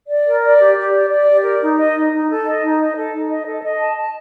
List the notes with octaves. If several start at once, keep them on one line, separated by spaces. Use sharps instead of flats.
D5
A#4
D5
G4
G4
D5
D5
G4
A#4
D#4
D#5
D#4
D#4
A4
D#5
D#4
D#5
A4
D#4
D#5
A4
D#5
A5
A5